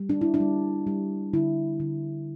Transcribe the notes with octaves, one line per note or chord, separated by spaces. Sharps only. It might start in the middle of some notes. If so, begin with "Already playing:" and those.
Already playing: G3
D4
E4
D4
G3
G3
D3 E4
D3